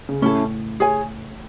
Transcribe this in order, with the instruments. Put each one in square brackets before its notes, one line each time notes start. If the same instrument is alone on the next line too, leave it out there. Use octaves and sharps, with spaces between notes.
[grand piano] C#3
[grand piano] A2 [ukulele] C#4 E4 A4
[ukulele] G#4 C#5 G#5